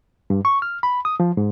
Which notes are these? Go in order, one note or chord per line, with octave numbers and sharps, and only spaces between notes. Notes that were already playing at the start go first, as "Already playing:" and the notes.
G2
C#6
F6
B5
D#6
F3
G#2